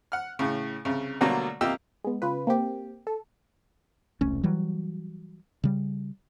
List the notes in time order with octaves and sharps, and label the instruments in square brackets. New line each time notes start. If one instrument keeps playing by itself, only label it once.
[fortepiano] F#5 F6
A2 C#3
C2 C#3
B2 D3 F#3 G3 A3 A#3
C2 A#3 F4 G4 D#5 E6
[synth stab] G#3 B3
C#3 F4 B4
A#3 C4 G4
A4
[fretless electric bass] E1 C2 A3 C#4
E3 F#3 G3
C#3 G3